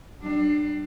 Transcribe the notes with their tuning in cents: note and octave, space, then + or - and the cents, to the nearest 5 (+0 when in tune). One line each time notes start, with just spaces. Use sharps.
G3 -30 D4 +25